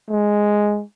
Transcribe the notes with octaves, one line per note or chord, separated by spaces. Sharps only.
G#3